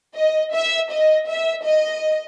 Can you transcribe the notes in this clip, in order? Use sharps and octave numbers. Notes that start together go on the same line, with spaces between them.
D#5
E5
D#5
E5
D#5